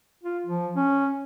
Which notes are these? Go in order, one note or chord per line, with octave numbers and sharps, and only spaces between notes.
F4
F3
C#4